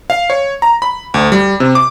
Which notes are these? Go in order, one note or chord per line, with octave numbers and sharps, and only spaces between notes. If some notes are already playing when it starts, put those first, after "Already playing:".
F5
C#5
A#5
B5
D2
G3
C3
D6